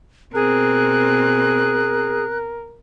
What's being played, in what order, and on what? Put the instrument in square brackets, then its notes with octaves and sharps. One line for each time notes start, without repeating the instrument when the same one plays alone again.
[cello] B2 C4 [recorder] G#4 [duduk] A#4 [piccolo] F#6